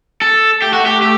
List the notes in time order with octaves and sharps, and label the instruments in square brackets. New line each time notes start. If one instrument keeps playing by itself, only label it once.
[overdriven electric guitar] A4
[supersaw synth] A3 [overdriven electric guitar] G4
[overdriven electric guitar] F#4
G4
G4